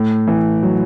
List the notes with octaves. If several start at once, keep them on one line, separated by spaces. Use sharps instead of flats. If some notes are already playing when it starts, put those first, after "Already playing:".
Already playing: A2
E3
F#3